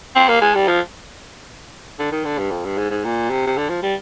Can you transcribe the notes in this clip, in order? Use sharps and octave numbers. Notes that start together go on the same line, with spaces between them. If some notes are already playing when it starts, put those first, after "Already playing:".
C4
A#3
G#3
G3
F3
D3
D#3
D3
G2
F2
G2
G#2
G#2
A#2
C3
C3
D3
F3
G3